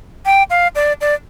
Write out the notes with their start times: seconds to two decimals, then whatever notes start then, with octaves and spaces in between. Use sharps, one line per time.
0.26 G5
0.50 F5
0.75 D5
1.01 D5